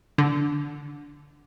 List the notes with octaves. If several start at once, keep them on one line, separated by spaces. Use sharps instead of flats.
D3